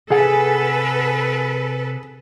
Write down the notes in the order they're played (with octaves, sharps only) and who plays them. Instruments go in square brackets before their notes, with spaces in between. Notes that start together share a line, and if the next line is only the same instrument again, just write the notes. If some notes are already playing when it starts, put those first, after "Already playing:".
[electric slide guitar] C3 F#5 G#5 [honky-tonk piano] G#4 [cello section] A4 B4